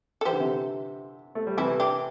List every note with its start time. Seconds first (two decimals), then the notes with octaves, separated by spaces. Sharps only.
0.21 A4
0.25 E3 G4 C5
0.33 D3
0.40 C3 E3
1.35 A3
1.47 G3
1.57 C3 E3 E4 A4
1.80 D4 G4